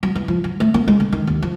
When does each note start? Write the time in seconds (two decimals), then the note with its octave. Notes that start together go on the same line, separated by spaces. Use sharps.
0.03 F#3
0.15 E3
0.28 F3
0.44 F#3
0.60 A3
0.74 A#3
0.88 G#3
1.00 D3
1.12 D#3
1.27 D#2
1.42 F3